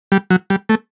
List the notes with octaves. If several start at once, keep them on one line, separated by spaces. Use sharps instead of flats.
G3
F#3
G3
A3